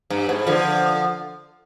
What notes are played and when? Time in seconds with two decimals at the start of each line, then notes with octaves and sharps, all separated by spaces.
0.10 G2
0.29 G#2
0.47 D3 F3